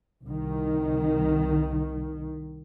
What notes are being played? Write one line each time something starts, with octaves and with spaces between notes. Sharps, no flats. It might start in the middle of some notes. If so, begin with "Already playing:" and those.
C2 D#3